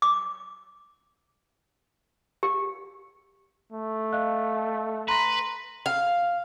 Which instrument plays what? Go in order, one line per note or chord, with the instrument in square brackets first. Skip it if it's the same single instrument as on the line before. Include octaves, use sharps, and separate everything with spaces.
[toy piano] D6
G4
[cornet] A3
[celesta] D#5 F5 F#6
[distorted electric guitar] B4 [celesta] A#5 C6 A#6
[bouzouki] F5